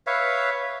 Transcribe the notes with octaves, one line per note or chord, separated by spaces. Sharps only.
B4 C#5 E5 F5